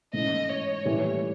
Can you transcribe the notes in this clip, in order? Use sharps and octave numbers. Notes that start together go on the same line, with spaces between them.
G#2 E3 A3 C#4 D#5
C#5
A2 E3 G3